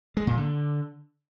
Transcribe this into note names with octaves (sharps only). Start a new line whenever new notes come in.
G#3
A#2
D3